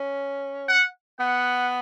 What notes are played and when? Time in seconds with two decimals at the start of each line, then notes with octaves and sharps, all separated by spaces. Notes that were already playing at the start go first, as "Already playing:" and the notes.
Already playing: C#4
0.68 F#5
1.19 B3 F#5